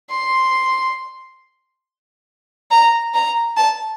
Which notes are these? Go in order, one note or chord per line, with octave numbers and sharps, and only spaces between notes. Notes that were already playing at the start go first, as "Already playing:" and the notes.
C6
A#5
A#5
A5